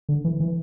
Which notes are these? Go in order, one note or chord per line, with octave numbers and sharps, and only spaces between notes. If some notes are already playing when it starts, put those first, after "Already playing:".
D3
E3
E3